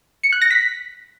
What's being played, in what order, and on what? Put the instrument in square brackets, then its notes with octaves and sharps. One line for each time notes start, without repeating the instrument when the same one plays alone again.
[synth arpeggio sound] C#7
F#6
A#6
B6